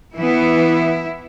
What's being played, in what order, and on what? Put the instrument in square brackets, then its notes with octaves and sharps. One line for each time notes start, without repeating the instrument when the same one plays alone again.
[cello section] E3 B3 E4